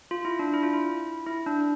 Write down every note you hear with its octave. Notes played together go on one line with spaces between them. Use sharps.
F4
E4
D4
E4
F4
E4
E4
D4